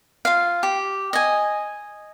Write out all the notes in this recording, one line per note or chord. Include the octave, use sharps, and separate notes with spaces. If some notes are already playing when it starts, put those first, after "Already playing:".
F4 F5
G4
D#5 G#5